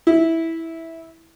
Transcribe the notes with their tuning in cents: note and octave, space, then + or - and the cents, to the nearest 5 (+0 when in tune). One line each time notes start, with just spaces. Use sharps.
E4 -10